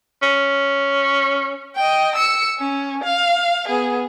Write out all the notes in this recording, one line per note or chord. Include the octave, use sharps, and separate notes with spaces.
C#4
D#5 G5
E6 C#7
C#4
F5
B3 G#4